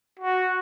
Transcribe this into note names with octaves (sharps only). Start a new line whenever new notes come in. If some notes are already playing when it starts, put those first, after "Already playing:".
F#4